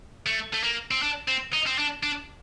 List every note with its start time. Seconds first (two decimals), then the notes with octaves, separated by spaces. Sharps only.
0.26 A3
0.54 A3
0.63 A#3
0.91 C4
1.02 D4
1.28 C4
1.53 D#4
1.67 C4
1.78 D4
2.03 D4